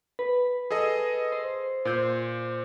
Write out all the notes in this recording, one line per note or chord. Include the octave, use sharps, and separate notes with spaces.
B4
G#4 A4 D#5
C5
A#2 C5 G6